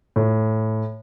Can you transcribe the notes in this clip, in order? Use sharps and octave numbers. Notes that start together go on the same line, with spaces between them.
A2